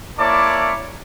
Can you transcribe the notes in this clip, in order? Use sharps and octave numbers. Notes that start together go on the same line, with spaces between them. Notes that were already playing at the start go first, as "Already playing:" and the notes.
A#3 E4 C#5 D5 A5 D6